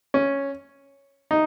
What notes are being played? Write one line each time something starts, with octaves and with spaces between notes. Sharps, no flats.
C#4
D#4